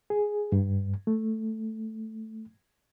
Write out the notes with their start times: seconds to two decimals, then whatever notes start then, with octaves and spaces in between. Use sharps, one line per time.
0.10 G#4
0.52 G2
1.07 A3